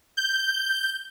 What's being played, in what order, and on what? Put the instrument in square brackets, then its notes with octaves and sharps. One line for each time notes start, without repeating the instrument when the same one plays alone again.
[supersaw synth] G6